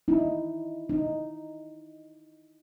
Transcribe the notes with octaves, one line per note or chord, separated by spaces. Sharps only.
D#4 E4
D#4